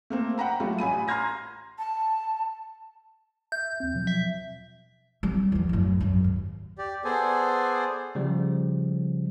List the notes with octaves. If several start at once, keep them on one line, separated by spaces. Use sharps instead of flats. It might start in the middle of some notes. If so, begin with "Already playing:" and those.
A3 A#3 C4
F#5 G5 A#5 B5
F#3 G3 A3 F4 F#4
A1 G#5 B5 D#7
A#5 C6 F6 G#6 A#6
A5
E5 G6
D#2 C4
B2 F3 F#3
E5
G3 C4
E2 F3
A1 F#2
G#1 F#2
D#2
G4 D5
B3 G#4 A4 C5 D5 G#5
C#3 F3 G3